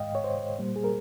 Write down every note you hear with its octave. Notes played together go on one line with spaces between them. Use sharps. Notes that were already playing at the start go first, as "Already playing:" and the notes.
Already playing: G#2 D#3 G#3 D#5 F5 G5
C#5
C5
A#2 G3 A#3
G#4
A#4